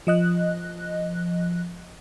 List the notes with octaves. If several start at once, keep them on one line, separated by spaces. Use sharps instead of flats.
F3 D#5 F#6